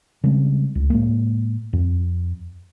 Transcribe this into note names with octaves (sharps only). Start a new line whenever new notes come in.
C#3 G3 G#3 C4
C#2
A2 G#3 A#3
F2